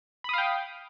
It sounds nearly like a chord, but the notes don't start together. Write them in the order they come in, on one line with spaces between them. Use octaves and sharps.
B5 D#6 F5 G5